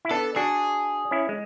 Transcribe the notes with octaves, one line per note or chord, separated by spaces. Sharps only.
E4
B3 D4 A4
D4 F#4 G#4
C#4 E4
G#3